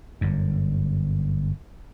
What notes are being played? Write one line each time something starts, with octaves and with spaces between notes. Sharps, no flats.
G1 F#2